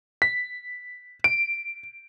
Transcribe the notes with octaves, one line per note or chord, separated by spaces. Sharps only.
B6
D7